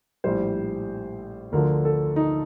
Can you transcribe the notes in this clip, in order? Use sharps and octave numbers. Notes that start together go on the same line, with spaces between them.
A#1 A2 G3 C5
D2 D3 F3 A#4
A4
D#4